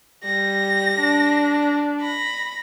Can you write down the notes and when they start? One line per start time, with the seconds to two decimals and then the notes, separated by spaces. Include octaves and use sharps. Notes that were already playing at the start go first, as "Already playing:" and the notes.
0.25 G3 A#6
1.00 D4
2.01 B5 A#6